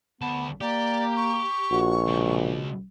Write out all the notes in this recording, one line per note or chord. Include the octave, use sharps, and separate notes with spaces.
D2 B3 A5
A#3 G4 D5
C#6
A#1 F#4
C#2 B2